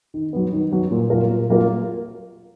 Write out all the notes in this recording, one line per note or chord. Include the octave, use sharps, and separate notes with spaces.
D#3
F#3 B3
D#3
F#3 B3
A#2
F#3 A#3 F4 A#4
A#2
F#3 A#3 F4 A#4